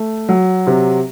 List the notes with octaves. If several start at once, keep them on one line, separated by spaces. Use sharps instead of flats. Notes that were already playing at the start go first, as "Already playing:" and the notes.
Already playing: A3
F#3
C3